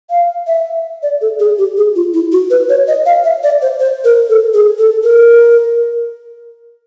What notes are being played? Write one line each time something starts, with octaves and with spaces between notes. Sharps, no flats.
F5
E5
D5
A4
G#4
G4
G#4
F4
E4
F#4
B4
C#5
D#5
F5
E5
D5
C5
C5
A#4
A4
G#4
A4
A#4